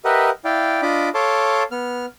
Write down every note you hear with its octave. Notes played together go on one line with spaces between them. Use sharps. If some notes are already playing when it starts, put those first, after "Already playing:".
G4 A#4 B4 D#5 E5 F#5
E4 D5 F5 G5
D4 F4 D#5 B5 D6
A4 C#5 F5 A5 C6 D6
B3 F6